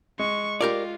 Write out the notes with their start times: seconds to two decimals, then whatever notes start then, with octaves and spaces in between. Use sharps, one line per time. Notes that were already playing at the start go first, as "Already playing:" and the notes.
0.19 G#3 C#6
0.61 F4 G4 A#4 D5